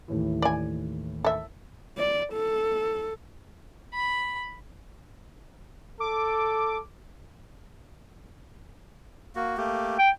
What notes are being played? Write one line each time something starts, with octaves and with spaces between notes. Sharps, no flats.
D#2 A2 E3
D5 G#5
A4 E5
D5
A4
B5
A4 D6
A#3 F#4
A3 A#3 G4
G5